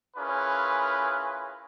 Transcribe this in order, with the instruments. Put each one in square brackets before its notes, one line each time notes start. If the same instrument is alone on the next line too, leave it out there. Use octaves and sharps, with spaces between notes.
[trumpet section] C#4 E4 F4 G#4 A#4 B4